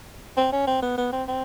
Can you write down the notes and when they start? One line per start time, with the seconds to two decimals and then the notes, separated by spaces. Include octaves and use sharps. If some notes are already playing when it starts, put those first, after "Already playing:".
0.37 C4
0.52 C#4
0.67 C4
0.82 B3
0.97 B3
1.12 C4
1.28 C4